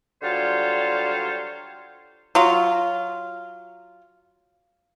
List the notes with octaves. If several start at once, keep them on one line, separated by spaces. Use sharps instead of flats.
D3 F#3 G3 F4 C5 C#5
F#3 F4